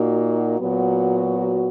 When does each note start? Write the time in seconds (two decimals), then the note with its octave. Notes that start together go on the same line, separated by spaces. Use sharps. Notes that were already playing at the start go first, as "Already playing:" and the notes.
Already playing: A#2 A#3 D#4 F#4
0.60 A#2 F#3 B3 F#4